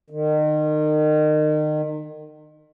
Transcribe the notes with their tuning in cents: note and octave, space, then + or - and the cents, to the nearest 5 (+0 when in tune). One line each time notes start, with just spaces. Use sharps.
D#3 -30